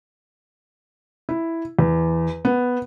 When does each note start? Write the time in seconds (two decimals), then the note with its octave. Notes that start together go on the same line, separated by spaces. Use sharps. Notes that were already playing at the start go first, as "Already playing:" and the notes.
1.29 E4
1.79 E2
2.45 B3